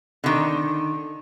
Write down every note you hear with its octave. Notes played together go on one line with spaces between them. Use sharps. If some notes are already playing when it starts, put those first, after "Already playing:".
D3 D#3